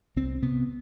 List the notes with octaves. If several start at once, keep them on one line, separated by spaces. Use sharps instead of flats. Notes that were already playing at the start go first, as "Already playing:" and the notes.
C2 C4
C3 B3